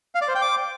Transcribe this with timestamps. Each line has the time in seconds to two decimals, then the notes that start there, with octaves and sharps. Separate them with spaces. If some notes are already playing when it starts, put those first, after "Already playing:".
0.15 F5
0.21 D5
0.28 C5
0.35 G5
0.42 D6